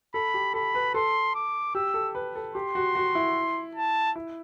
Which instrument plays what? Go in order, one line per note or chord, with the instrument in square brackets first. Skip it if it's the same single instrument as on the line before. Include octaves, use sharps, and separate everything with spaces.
[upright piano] A4 [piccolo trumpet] B5
[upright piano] G4
[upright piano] A4 [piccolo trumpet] B5
[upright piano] B4
[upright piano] A4 [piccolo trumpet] C6
[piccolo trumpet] D6
[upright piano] G4 [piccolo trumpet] E6
[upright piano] A4
B4
A4
[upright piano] G4 [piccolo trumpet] C6
[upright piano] F#4
F#4
E4
[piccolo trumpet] A5
[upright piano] E4